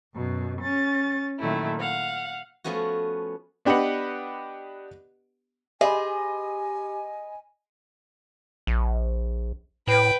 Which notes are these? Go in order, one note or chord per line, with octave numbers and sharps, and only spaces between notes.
F#2 B2
C#4 A6
A#2 D#3 F#3 A3 E4
F5 F#5
F3 A3 B3 C#4 F#4
B3 D4 G4 B4 D#5 F#5
G4 G#4 C5 D#5 G#5 B5
A#1
A2 B4 G5